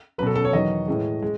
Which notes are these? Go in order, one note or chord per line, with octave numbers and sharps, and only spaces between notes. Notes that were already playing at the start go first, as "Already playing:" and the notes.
B2 F#3 A4 B4
A4
C#5
E2 D#3 F#3 D#5
A2 E3 G#3
G#3